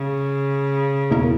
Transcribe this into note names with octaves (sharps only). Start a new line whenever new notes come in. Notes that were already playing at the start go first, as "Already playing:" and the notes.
Already playing: C#3
E2 B2 A#3 E4 A#4